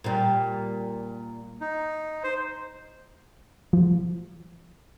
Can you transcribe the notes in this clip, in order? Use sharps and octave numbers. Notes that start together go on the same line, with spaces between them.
A#2 G3
D#4
C5
F3